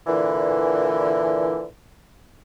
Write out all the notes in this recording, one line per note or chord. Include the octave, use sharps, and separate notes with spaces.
A#2 D3 E3